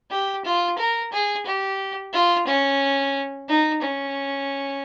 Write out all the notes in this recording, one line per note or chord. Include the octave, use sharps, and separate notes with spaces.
G4
F4
A#4
G#4
G4
F4
C#4
D#4
C#4